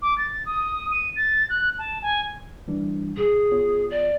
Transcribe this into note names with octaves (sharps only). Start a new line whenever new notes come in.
D6
A6
D#6
D#7
A6
F#6
A5
G#5
E3 G3 D4
A#2 G#4 D#6
B3 F4 C#5
D5